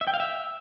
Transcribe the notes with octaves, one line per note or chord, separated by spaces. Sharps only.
E5
G5
F5
E5